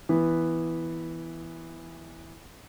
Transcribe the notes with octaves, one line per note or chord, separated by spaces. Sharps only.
E3 B3